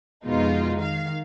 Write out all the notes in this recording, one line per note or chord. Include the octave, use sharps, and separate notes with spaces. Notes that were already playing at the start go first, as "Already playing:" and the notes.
F2 B2 G#3 D#4 F4
D#3 F5